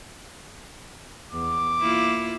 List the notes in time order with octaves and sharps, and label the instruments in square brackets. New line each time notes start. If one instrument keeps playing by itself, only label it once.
[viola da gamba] E2 [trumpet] D6
[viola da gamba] A#3 E4 F4